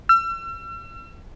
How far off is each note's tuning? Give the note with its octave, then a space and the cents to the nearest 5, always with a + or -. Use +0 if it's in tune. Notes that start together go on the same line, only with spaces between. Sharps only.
E6 +45